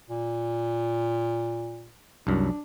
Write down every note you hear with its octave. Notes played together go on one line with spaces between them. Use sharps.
A#2
C2 F#2 D4